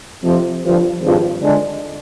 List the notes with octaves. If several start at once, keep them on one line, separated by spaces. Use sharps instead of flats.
F2 C3 F3
G1 G2 F3
G#1 G2 F3
D3 G#3 D4